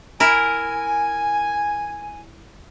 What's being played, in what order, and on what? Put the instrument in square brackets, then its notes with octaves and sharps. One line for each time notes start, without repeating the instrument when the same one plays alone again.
[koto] E4 A#4 [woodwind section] G#5